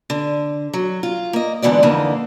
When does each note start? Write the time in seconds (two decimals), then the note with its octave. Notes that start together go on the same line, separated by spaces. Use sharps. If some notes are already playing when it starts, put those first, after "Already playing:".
0.10 D3
0.73 F#3
1.03 F4
1.33 A#3 D#5
1.62 G#2 D3 E3 B3 D5
1.83 F2 D3 E3 A#3 D#4